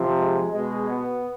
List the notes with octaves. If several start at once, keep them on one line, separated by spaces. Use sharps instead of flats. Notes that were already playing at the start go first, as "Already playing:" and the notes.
Already playing: C3 F3
G#3
B2 G#3
B3